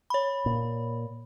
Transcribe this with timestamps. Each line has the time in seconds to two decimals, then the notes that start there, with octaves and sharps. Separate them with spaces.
0.10 C#5 B5
0.46 A#2